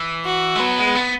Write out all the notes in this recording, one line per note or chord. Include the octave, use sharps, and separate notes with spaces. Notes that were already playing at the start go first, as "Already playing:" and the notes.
Already playing: E3
F#4
G#3
F#3 B3
G#3
B3